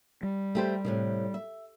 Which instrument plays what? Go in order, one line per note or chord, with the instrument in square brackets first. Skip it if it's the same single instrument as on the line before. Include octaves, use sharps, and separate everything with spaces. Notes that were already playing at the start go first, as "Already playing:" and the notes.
[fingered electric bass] G3
[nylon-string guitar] A3 G4 C5
A2 C3 D#3
E5